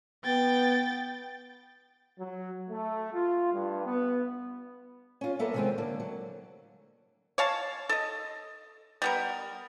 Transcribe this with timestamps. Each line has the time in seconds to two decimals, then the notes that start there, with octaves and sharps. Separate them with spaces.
0.25 B3 G5 A6
2.19 F#3
2.69 A3
3.13 F4
3.53 G2
3.86 B3
5.21 C#4 F4
5.39 F#3 A#3 B3 A4 A#4 E5
5.53 C3 D#3 E3 G#3 B3 C4
5.78 A2 D3 F#3 A#3
6.00 F#3
7.38 C#5 F5 A5
7.89 A4 D#5
9.02 G3 B3 A#4